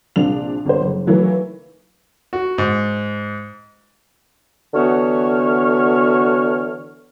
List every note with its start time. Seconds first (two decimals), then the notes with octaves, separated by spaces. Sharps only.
0.16 A#1 C3 F3 D4 F7
0.65 G1 C5
0.82 F#1
1.06 D#3 E3 F#3 A3 A#3
2.33 F#4
2.58 G#2
4.74 D3 E3 B3 F#4 C#5 F6